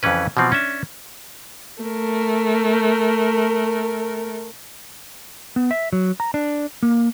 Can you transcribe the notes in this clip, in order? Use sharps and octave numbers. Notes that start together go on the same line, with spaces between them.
F2 C#3 E3 C#4 B4
B2 E3 F3 C4
C#4 D4 E5
A3 A#4
B3
E5
F#3
A#5
D4
A#3